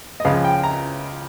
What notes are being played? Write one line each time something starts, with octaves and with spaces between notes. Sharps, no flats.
D#5
C#2 C#3 F3 G#3 F5
G5
A#5